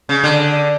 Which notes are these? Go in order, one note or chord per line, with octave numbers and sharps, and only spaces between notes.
C#3
D3